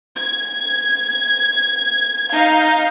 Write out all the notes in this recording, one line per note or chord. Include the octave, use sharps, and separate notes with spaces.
G#6
D#4 F5 G6